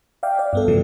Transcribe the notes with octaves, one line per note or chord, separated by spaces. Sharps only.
D5 E5 F5 G5
D5
G2 B3 A4
A2 C#3 E3 F3